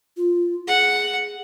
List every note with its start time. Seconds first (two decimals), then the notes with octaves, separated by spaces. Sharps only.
0.17 F4
0.67 G#4 F#5